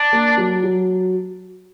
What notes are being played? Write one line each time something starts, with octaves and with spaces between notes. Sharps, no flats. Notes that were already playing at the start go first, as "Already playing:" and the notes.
Already playing: D4
A#3
F#3
F#3